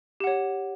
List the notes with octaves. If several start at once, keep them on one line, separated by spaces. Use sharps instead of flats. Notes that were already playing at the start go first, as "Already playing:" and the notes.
G4 C#5 F#5